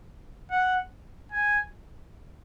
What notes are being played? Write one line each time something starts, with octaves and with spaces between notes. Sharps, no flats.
F#5
G#5